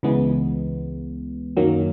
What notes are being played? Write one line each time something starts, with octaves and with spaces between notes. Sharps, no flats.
C#2 C#3 E3 G#3 B3
F#2 D#3 F#3 A#3